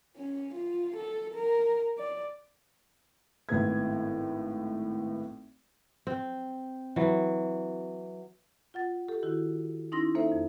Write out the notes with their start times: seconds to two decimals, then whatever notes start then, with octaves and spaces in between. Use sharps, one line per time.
0.17 C#4
0.54 F4
0.96 A4
1.35 A#4
1.98 D5
3.49 G#1 A2 B3 G#6
6.07 C4
6.96 E3 F#3
8.74 F4 F#5 A6
9.08 G4 A4
9.23 D#3 E4 F#4
9.92 C#4 D#4 E4 C6 A#6
10.15 A#3 D#4 A4 C5 E5
10.32 F2